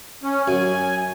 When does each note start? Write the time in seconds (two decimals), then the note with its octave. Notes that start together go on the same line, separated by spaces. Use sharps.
0.23 C#4
0.48 F#2 G#5